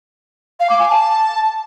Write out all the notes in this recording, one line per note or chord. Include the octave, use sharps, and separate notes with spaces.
F5
D6
G#5
A5